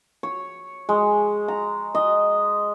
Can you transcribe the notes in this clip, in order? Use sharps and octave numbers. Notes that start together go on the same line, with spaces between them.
C#5
G#3
A#5
D#5